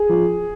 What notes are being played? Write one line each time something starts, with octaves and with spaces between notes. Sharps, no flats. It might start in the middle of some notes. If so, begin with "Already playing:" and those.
Already playing: G#4
F3